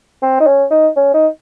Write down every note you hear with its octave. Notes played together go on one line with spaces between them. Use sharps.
C4
D#4
C#4
D#4
C#4
D#4